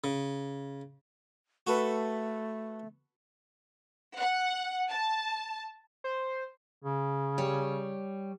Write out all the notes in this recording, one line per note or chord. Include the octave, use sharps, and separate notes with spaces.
C#3
A3 F#4 A4 B4
F#5
A5
C5
C#3
G3 C#5